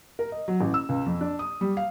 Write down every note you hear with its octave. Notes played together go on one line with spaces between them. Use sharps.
A#4
D#5
F#3
A1
E6
C#2
F2
D4
D#6
G3
F5